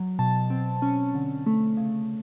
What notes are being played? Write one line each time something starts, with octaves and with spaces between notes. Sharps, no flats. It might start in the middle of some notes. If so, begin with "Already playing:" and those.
Already playing: F#3
B2 A5
C4
C#4
D3
A3
C#3